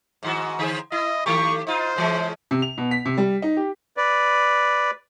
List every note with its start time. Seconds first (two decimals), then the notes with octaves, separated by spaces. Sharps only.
0.23 G#2 D#3 F#4
0.59 D3 G#4 C5
0.92 E4 D#5
1.26 D#3 A3 G4 C#6
1.67 D#4 F4 C5
1.96 C#3 E3 G#3
2.51 C3
2.62 F7
2.78 B2
2.91 B6
3.05 C3
3.17 G3
3.42 D#4
3.57 G4
3.97 B4 D5